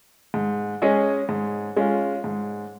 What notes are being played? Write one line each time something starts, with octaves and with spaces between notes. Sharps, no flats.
G#2
G#3 C#4 G#4 D#5
G#2
G#3 C#4 F4
G#2